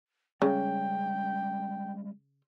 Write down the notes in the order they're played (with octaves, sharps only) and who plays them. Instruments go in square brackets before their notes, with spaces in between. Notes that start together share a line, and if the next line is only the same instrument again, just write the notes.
[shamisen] C#3 [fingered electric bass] G3 G#3 C#4 [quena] G5